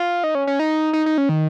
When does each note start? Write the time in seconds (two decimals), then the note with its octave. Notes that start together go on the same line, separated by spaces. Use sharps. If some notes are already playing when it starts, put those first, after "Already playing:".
Already playing: F4
0.24 D#4
0.35 C#4
0.47 C#4
0.59 D#4
0.93 D#4
1.06 D#4
1.18 C#4
1.29 D#3